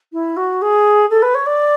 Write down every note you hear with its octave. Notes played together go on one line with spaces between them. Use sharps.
E4
F#4
G#4
A4
B4
C#5
D5